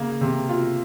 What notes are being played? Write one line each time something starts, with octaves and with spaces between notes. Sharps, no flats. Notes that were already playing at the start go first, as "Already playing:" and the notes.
Already playing: C#3 A#3
C3
F4